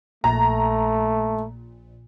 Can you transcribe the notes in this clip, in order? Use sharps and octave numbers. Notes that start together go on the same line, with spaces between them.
A#1 A#2 A3 A#5